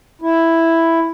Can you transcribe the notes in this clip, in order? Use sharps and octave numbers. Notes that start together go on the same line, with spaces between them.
E4